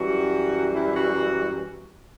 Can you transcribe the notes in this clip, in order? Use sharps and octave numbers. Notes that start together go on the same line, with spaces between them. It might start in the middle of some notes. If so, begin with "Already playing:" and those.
Already playing: F#2 E3 G3 F#4
E4
F#4